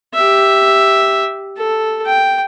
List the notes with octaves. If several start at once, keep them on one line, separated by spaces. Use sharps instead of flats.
G4 E5
A4
G5